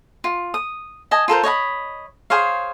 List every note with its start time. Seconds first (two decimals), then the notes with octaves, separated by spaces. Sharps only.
0.24 F4
0.54 D#6
1.11 D#5 G#5 A5
1.28 F4 A4 A#4 C5
1.43 C#5 D#5 F#5 B5
2.30 G#4 C5 C#5 F5